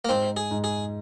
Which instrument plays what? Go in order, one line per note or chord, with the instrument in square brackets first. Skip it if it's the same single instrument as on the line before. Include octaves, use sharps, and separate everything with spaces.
[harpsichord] A#3
[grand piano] G#2 [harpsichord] C4
[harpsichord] G#4
[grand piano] G#2
[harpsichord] G#4